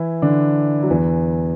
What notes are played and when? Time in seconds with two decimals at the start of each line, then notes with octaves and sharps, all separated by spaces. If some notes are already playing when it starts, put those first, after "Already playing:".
Already playing: E3 E4
0.22 D3 D4
0.83 F#3
0.90 E2 E3